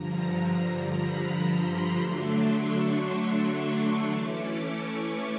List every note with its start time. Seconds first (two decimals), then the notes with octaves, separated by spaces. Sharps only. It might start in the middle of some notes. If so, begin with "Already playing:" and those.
Already playing: G2 D3 F3 A#5
0.92 B5
1.44 C6
1.96 D3 F#3 A3 D4
2.50 C#6
3.02 C#6
4.07 E3 A3 C#4 D6
4.60 C#6